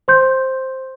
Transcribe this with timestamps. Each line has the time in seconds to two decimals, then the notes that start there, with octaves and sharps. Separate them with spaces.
0.08 C5 C6 G6